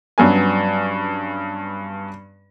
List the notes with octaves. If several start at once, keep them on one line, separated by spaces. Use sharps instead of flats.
G2 F#3 B3 C#4 G#5